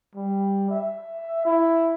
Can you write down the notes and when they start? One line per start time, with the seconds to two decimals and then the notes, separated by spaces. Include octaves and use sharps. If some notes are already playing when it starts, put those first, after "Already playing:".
0.15 G3
0.71 E5
1.45 E4